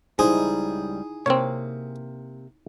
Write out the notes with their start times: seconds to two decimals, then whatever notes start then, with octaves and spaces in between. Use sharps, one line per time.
0.19 C#2 G3 D#4 E4 G#4 C5
1.26 C3 A#3 C4 C#5